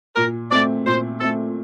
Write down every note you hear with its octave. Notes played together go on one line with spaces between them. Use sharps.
A#2 A#4
A3 C4 D5
A#2 C5
A3 C4 A4